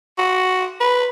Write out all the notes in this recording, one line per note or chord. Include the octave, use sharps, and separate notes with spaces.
F#4
B4